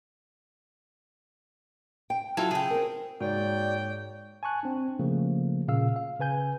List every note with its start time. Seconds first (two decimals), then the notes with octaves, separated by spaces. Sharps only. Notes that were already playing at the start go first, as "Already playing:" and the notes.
2.10 G5
2.37 F#3 E4 F4 A4 F5 G#5
2.51 C#3 G#4 G5
2.70 C4 A#4
3.20 G#2 A#3 F#4 C#5 D5 G5
4.43 G#5 A5 C#6 F#6
4.63 C4 D4
4.99 C#3 F3 A3 A#3
5.68 A#2 C#3 F5 E6
5.96 F5
6.20 C#3 B4 G#5 G6